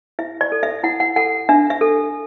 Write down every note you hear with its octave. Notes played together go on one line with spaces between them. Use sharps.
E4 E5
D5
A4
E5
E4 F#5
F#5
A4 F#5
D4 E5
E5
A4